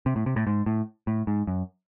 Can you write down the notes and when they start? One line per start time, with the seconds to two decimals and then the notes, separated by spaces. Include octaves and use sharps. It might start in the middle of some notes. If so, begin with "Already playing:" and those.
0.06 C3
0.16 A2
0.26 C3
0.36 A2
0.47 G#2
0.66 A2
1.07 A2
1.27 G#2
1.47 F#2